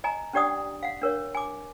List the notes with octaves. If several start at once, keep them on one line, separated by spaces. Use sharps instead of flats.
D#5 G#5 A#5
C#4 D4 G4 D5 F#5 D#6
F5 F#5
D4 A#4 C#5
G#5 D6